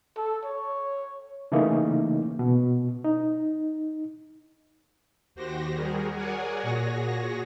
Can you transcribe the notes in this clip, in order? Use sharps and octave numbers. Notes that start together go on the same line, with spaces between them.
A4
C#5
C#3 E3 A3 A#3 C#4 D#4
B2
D#4
D#2 F#4 G4 C5 A#6
G3 F#4 G#4 A#4
G#4 A#4 C#5 D5 F#5 G#5
A#2 F#4 G#4 C#5 A#6